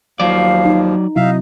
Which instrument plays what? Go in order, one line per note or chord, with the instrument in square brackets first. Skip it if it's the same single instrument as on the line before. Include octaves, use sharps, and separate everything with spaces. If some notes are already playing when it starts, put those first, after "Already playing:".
[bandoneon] D#2 F3 [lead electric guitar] F#3 D5 [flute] F5
[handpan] D#4
[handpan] C3 F#3 E4 [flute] D#4 [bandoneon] E5 F5